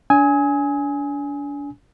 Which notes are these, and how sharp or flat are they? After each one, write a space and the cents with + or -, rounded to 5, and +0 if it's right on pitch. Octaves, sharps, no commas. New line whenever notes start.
D4 -35 G#5 +0 D#6 +45